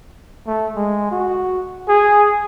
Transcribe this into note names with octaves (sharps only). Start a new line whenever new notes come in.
A3
G#3
F#4
G#4